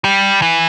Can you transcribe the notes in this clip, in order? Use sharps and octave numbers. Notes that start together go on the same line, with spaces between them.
G3
E3